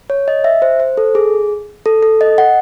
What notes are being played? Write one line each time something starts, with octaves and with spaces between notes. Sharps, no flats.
C#5
D#5
E5
C5
C5
A4
G#4
A4
A4
D#5
F#5